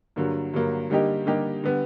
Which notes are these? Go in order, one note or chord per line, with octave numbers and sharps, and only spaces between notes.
G2 D3 F#3 A#3
G2 D3 F#3 A#3
D3 G3 A#3 D#4 G4
D3 G3 A#3 D#4 G4
D3 G3 B3